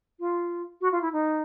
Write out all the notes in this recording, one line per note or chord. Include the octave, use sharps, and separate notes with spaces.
F4
F#4
F4
E4
D#4